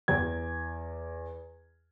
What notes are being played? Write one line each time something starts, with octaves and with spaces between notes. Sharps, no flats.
E2 G#6